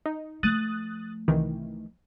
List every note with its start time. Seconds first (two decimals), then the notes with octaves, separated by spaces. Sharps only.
0.06 D#4
0.43 F3 A3 D#6 F#6 A6
1.28 C2 D#3 E3